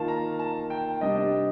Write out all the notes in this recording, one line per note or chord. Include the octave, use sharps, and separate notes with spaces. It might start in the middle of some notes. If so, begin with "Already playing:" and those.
Already playing: D#3 A#3 F4 A5
A#5
A5
G5
C3 G3 D4 D#5